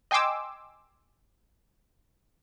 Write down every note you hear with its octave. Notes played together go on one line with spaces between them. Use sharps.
D#5 G5 G#5 C6 D6 E6